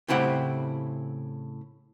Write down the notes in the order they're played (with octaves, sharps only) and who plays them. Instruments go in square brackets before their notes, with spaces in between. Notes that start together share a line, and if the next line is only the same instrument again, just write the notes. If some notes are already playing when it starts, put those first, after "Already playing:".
[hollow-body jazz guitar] A2 C#3 C4 E4 G4 F#5